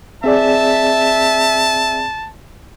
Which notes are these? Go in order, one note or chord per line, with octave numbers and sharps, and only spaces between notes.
C4 G#4 D5 E5 A5